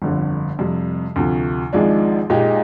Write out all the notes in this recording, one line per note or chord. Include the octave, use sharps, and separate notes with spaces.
G1 F2 D3
F2 C3 G3
D2 C3 F3
G#1 G#2 F3 G#3 D4
A#2 G#3 D#4 G4